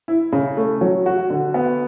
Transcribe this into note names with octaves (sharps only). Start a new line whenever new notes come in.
E4
C#3
A3
F#3
F#4
D3
B3